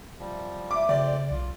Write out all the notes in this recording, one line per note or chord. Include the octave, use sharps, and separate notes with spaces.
C3 F3 G3
A3 E5 D6
F2 C#3 C4 G4 D5
B1 F4